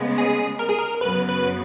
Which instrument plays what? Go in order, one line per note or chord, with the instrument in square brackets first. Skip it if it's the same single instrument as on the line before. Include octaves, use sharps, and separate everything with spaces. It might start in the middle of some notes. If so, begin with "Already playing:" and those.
Already playing: [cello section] C#3 G#3 B3
[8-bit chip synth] G#4
A#4
G#4
A#4
[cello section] F#2 C#3 F#3 B3 [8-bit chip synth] B4
[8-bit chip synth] B4